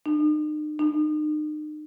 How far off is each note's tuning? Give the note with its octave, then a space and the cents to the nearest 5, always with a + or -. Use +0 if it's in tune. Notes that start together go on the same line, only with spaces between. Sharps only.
D#4 -45
D#4 -40